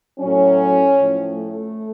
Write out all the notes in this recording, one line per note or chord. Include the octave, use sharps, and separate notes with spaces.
A2 F#3 C#4
A2 F3
A3